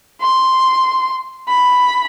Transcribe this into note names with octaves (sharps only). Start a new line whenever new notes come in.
C6
B5